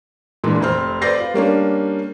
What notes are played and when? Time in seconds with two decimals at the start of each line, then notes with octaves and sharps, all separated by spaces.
0.44 A#2 E3 G#3 D4
0.61 F1 C4 C5 F6
1.01 B4 C5 D5 G6 A#6 C7
1.20 F4
1.34 G3 A#3 C#4 D4